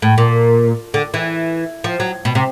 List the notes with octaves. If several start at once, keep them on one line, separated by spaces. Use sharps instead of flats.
A2
A#2
D3
E3
F3
F#3
B2
C3